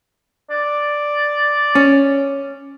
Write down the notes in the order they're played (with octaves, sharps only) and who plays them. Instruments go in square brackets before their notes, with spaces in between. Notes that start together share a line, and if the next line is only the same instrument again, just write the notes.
[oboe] D5
[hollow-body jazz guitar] C#4